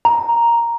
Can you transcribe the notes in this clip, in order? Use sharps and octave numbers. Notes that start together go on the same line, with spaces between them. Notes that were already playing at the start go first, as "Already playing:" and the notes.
A#5